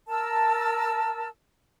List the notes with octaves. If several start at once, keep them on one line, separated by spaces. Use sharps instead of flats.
A#4 A5 E6